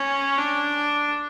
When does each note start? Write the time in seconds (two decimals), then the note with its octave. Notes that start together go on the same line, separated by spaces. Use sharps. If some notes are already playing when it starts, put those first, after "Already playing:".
Already playing: C#4
0.37 D4